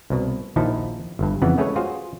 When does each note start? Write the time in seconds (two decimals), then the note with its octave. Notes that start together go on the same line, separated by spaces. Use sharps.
0.10 C2 B2
0.56 A#1 D#2 F3 D#4 E4 A5
1.19 G1 G2
1.42 F2 C#3 E3 B3 F#5
1.58 G#3 A3 C#4 G#4 B4 C#5
1.76 F4 F#4 G#4 C5 F5